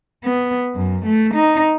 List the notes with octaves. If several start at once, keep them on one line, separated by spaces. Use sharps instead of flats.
B3
F#2
A3
D#4